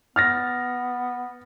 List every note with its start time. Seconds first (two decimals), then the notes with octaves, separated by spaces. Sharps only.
0.16 B3 F6 A6 A#6